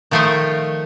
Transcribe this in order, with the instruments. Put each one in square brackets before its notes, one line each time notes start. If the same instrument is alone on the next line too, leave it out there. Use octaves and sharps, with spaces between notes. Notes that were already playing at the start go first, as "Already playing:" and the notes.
[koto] D#3 F3 A3 C5 C#5 D#5